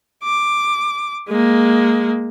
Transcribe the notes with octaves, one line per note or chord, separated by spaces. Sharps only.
D6
G#3 A#3